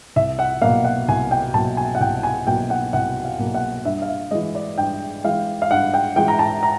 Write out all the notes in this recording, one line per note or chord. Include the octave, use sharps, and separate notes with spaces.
C2 E5
F#5
B2 F#3 A#3 F5
F#5
C2 G#5
G5
B2 F#3 A#3 A5
G#5
F#5
C2 G5
G#5
B2 F#3 A#3 G5
F#5
C2 F#5
F5
B2 F#3 A#3
F#5
G2 E5
F5
E5
E3 G#3 D#5
D5
G2 G5
E3 G#3 F5
F5
G2 F#5
G5
E3 G#3 G5
A#5
A5
A#5